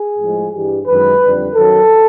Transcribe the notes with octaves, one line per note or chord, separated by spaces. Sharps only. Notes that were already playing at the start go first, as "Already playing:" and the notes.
Already playing: G#4
A2 F3 G#3
G2 E3 G3
F#2 D#3 G#3 B4
F2 D3 G3
F#2 D#3 F#3 A4